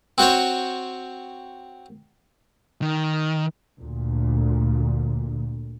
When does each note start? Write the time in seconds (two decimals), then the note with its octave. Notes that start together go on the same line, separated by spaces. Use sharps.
0.18 C4 F#4 C5 C#5
2.82 D#3
3.79 D2 A#2